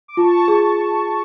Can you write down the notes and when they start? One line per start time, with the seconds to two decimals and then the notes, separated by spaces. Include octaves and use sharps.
0.08 D6
0.17 F4 A5 C#6
0.48 G#4